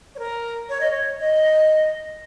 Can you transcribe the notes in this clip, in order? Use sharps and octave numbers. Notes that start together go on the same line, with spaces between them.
C#5
A#4
C#5
D#5
C#5
D#5